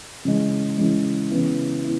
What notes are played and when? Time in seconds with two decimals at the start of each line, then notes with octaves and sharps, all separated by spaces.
0.25 C#3 E3 G#3
0.78 C#3 E3 G#3
1.30 C#3 E3 B3 E4
1.84 B3 E4